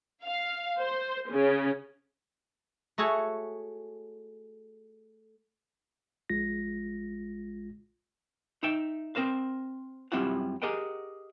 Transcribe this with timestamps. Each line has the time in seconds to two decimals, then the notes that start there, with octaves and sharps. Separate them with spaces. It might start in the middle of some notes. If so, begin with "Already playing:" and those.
0.24 F5
0.80 C5
1.30 C#3
2.98 A3 F#4 G#4 A4 C#5
6.29 A#1 G#3 F4 A#6
8.63 D#4 E5 G5
9.15 C4 A#4 C5 F5
10.12 F#2 G3 C4 E4 F4 F#5
10.62 G4 G#4 A#4 D#5 F#5 G5